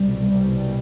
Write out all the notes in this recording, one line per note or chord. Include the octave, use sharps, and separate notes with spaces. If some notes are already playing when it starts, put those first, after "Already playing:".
Already playing: C2 B2 G3
G3